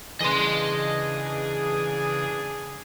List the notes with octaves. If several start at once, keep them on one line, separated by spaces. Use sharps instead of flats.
C#3 E3 D4 G#4 D#5 C6